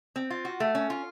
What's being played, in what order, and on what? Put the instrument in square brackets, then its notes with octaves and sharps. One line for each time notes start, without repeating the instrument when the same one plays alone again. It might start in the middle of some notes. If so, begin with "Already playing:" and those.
[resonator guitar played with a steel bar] C4
F4
F#4
A3
C#4
F4